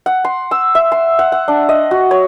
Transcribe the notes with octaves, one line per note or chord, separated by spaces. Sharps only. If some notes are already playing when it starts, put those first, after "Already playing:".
F#5
C6
E6
E5
C6
F#5
F#5
D4
D#5
F#4
C#5